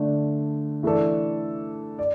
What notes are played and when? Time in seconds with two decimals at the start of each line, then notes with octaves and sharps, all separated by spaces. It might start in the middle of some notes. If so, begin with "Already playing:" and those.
Already playing: D3 A3 D4
0.83 E3 A3 D4 A4
1.99 D5